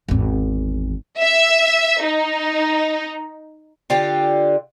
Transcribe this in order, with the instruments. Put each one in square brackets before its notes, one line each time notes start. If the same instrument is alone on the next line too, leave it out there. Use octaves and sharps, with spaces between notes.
[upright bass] G#1 E2
[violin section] E5
D#4
[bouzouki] D3 F4 G4